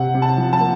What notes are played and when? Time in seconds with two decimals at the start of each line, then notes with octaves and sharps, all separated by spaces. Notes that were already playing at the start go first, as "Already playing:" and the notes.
Already playing: C3 F#5
0.14 C3
0.22 A5
0.37 F3
0.53 A5
0.60 A#3